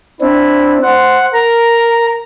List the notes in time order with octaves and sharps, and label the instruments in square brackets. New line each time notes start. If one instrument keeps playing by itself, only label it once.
[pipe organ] C4 D4 [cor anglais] E4
[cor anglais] C5 [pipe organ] F#5
[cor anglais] A#4 [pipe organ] A#5